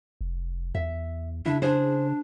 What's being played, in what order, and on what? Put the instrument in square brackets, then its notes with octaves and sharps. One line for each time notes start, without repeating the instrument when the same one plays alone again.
[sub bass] F1
[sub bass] E2 [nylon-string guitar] E5
[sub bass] C#3 [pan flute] D4 [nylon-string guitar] E4
[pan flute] D4 [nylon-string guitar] G#4 C5